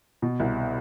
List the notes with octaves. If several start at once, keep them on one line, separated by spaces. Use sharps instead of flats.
B2
C2